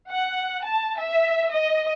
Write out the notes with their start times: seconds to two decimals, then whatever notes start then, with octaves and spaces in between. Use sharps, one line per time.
0.11 F#5
0.64 A5
0.98 E5
1.52 D#5